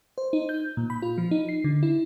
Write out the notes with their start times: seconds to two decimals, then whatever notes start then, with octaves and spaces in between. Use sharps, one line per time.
0.18 C5
0.33 D#4
0.49 G6
0.77 A#2
0.90 B5
1.02 F4
1.18 F3
1.31 D#4
1.49 C7
1.64 D3
1.83 E4